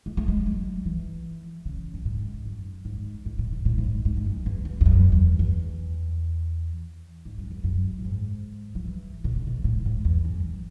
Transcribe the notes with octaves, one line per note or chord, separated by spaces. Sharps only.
G#3
A3
G#3
F#3
E3
C#3
F#2
G#2
F#2
G#2
G#2
A2
G#2
A2
G#2
G#2
G#2
F#2
E2
E2
E2
F#2
E2
E2
G#2
F#2
E2
F#2
A2
G#2
F#3
E3
B2
C#3
B2
A2
G#2
E2
F#2